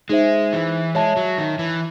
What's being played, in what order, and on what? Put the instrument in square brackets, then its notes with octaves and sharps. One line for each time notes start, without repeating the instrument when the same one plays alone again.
[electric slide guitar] G#3 [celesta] D#4 G#4 C5 E5
[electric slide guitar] E3
[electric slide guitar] G#3 [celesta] C#5 E5 A5
[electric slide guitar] F#3
D#3
E3